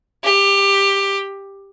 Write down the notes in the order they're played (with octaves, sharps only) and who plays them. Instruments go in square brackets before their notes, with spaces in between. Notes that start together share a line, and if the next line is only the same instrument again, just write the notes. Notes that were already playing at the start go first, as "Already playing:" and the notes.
[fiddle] G4